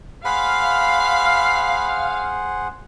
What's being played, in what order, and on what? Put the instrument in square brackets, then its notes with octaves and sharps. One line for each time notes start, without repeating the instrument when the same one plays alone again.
[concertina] G#4 C5 F#5 [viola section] F5 [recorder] B5